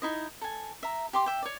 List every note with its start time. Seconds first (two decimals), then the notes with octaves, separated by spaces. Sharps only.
0.02 D#4 E4 D#5
0.41 A4 G#5
0.83 E5 A#5
1.13 G4 C6 D6
1.26 E5 G5
1.42 C#5 D5